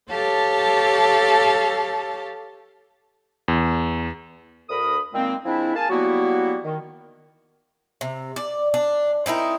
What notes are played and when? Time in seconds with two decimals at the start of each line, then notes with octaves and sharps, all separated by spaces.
0.11 G4 A4 C#5 F5 A5
3.48 E2
4.69 D2 A#4 B5 D#6
5.13 A#2 D#3 G#3 A#3 C4
5.46 F3 G#3 C4 D4 E4
5.75 A#3 G#4 F5 G#5 A5
5.90 F#3 G3 A#3 B3 E4 F#4
6.64 D#3
8.01 C3
8.36 D5
8.74 D4
9.26 C4 D#4 E4 A#4